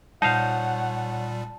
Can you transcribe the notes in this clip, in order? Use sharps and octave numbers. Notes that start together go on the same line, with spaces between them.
A#2 G3 D#4 C5 C#5 F5 F#5 A5